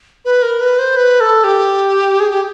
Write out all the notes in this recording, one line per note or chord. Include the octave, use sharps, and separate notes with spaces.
B4
A#4
B4
C5
B4
A4
G4
G#4
G4